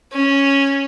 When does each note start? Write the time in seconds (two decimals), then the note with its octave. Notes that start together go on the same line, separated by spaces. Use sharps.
0.12 C#4